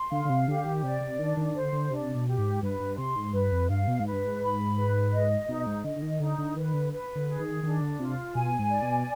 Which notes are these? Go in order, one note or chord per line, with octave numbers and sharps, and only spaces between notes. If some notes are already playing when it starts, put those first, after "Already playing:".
Already playing: C6
D3 F5
D3
C3
D3 G4
D#3
C3 D5
C3
D#3 D4
D#3
D3 C5
D3
C3 D4
B2
G4
G#2
G2 B4
G2
C3 C6
G#2
G2 B4
F2
G2 F5
B2
G#2
B4
G2
G#2
B5
B4
D#5
B2 D#4
G#2
D3 D#5
D3
D#3
D3 D#4
D3
D#3 B4
D3
B4
D3
G#4
D#3
D#3 D4
D3
C3 F4
B2 G#5
G#2
D5
B2